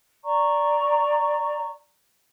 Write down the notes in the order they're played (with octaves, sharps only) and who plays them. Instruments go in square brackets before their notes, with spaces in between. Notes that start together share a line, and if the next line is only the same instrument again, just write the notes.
[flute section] D5 A#5 C#6